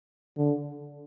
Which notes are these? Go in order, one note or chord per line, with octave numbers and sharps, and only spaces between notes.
D3